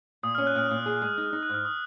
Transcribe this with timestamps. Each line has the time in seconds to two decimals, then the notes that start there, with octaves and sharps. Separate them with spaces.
0.23 A#2 D#6
0.35 C#4 F6
0.47 F#6
0.55 A#2 F6
0.70 A#2 D#6
0.86 G#4
1.02 G#3
1.18 D#4
1.33 D#4
1.43 F#6
1.49 G#2 F6
1.65 D#6